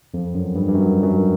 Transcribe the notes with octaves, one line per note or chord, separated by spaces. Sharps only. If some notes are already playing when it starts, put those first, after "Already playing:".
F2
F#2
G2
G2
F#2
F#2